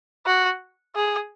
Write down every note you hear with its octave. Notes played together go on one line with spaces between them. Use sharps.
F#4
G#4